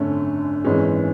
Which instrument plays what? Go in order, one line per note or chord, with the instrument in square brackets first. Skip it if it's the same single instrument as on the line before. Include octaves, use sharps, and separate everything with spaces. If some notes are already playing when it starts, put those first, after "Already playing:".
Already playing: [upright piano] G#1 F#2 D3 A3 C#4
G#1 F#2 E3 G#3 C#4